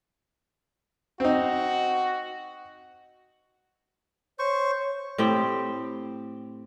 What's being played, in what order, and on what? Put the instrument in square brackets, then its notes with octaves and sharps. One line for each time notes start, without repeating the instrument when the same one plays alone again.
[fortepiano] C4 D#4 [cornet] F#4
[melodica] C5 C#6 [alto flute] C#5
[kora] A2 C4 G4 G5